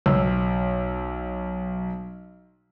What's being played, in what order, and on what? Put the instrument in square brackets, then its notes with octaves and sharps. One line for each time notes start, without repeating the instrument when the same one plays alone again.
[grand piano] B1 E6